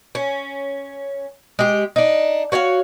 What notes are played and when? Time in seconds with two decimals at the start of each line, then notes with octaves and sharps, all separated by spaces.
0.15 C#4
1.59 G#3 G4
1.96 D4 D#4
2.52 F#4 C#5 E5 F5